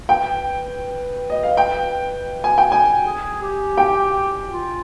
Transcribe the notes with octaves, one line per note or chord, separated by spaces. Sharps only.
B4 G5
D#5
F5
G5
G#5
G5
G#5
G#4
G4
G5
F4